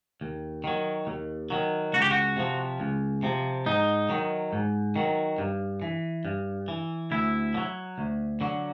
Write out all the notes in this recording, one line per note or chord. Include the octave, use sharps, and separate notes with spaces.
D#2
D#3 F#3
D#2
D#3 F#3
C#2 F#4
G4
F#4
C3 F3
C#2
C3 F3
G#2 D#4
D#3 F#3
G#2
D#3 F#3
G2
E3
G2
E3
D2 E4
D3
F#3
D2
D3 F#3